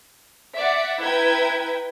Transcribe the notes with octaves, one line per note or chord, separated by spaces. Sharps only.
D5 E5 F#5
E4 B4 G5 A#5 G#6